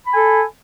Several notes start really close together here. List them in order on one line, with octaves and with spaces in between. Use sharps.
B5 G#5 A4